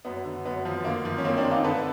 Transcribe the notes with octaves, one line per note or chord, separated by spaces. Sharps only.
F#2 B3
D3
F#2 B3
F3
D3 A#3
F3
C#4
F3 A#3 C4
C4 D4
D3
D#4 F4
D3 A4 B4